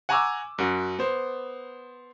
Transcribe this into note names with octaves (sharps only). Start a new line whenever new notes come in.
F#5 G#5 A#5 C#6 D6 E6
F#2 F#4
B3 C5